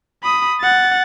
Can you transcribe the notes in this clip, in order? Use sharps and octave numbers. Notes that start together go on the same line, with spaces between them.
B5 D#6
F#5 A6